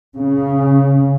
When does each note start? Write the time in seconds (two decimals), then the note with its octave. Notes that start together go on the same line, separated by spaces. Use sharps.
0.16 C#3